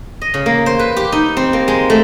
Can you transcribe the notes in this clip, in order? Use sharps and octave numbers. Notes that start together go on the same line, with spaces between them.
D#5
C#3
A#3
C5
B4
G4
D#4
C4
A#3
G#3
A3